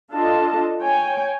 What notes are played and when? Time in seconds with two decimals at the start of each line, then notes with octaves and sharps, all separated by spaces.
0.11 D4 F4 A4 D#5 A5
0.81 C#5 G5 G#5